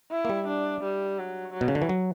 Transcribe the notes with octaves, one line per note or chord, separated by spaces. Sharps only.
E4
A#3
G3
D4
G3
F#3
F#3
B2
C#3
D3
E3
F#3